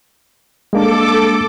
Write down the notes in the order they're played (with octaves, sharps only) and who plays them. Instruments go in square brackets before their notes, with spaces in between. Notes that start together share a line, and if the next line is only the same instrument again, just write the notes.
[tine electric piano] G#3 A#3 D4 [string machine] A4 D6